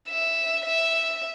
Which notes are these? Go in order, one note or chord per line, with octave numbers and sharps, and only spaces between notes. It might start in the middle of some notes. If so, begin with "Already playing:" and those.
E5
E5